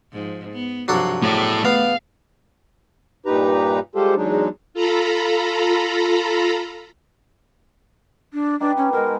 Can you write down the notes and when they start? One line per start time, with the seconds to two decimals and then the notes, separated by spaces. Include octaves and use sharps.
0.13 G#2 F3
0.52 B3
0.88 G2 C3 F3 F#3 D4 A4
1.22 E2 A2 A3 G#4 D5
1.65 B3 F5
3.26 G2 A#2 D#4 G4 B4 A#5
3.95 G3 G#3 F4 G4 A4 C5
4.17 E2 F#3 G#3 D4 D#4
4.74 F4 A4 A#5 B5
8.33 D4
8.60 D4 D#4 G4 B4
8.77 C#4
8.93 B2 G#3 A#4